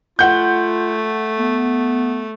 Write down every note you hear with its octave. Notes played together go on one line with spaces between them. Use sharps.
A3 F4 F#5 G6
B3